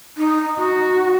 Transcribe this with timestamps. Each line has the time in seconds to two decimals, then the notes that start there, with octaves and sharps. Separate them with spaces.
0.17 D#4
0.60 F#4